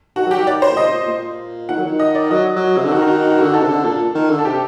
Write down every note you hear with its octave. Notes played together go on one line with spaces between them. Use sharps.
D#3 F#4
F#3 G4
D#3
D5
C5
A#2
C3 D#5
A#2
A#2
D#3 F#5
F#3
D#3
D#5
D5
F#3 D#5
F#3
C3
D3
D#3 F#4
D#4
F#4
F#4
F#4
D3
D#3 A4
C3
D3
A#2 A4
D#3
D3
A4
C3 G4